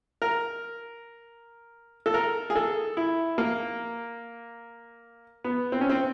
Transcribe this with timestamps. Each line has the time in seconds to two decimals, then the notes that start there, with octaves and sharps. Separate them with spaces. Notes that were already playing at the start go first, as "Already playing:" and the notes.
0.22 A#4
2.06 A4
2.14 A#4
2.50 G#4
2.56 A4
2.97 E4
3.38 A#3
5.44 B3
5.72 C4
5.81 C#4
5.90 C4